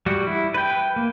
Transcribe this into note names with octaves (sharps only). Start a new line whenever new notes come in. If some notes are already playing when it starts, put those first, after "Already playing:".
G3 F#4
E4
B4 G5
A#3